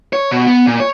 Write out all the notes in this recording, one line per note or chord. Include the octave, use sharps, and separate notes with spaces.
C#5
B2
B3
A#2
C#5